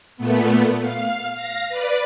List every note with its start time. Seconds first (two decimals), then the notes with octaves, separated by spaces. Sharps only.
0.17 A#2 A3 B3
0.82 F5
1.35 F5 A#6
1.69 B4 D5